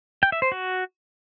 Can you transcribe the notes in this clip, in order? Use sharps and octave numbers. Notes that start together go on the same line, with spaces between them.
G5
E5
C5
F#4